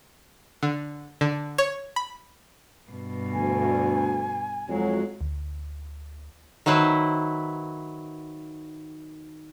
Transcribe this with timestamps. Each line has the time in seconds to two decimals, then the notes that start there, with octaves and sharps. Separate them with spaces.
0.63 D3
1.21 D3
1.58 C#5
1.96 B5
2.91 G2 B2
3.33 D2 G#5
4.69 F2 F#3 G#3
5.21 D2
6.66 D#3 F#3 E4 B4 C5